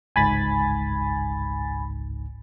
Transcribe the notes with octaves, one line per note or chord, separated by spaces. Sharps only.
G1 C#2 G#2 G#5 B5 A6